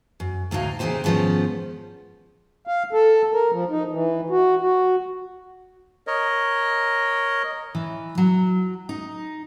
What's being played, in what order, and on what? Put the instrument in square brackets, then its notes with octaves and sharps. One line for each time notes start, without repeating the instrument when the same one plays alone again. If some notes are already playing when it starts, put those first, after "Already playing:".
[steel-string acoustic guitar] F#2
D2 A2 F#3 D#4 F5
C#3 E3 A#3 D#4 G4 C5
G#2 D#3 F3 B3 C#4
[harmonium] F5
A4
A#4
F3
D#4
E3
F#4
F#4
[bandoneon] A#4 C#5 D#5
[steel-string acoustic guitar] E3
F#3
D#4